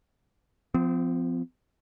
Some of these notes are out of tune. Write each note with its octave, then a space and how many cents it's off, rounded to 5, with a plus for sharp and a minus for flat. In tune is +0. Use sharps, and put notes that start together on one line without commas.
F3 +0 C4 -40